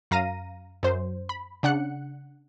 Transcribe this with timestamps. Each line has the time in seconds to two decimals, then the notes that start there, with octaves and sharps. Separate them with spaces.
0.11 F#2 F5 A#5 A#6 D#7
0.83 F#2 C5
1.29 B5
1.63 C#3 D4 F#5 F#6 C#7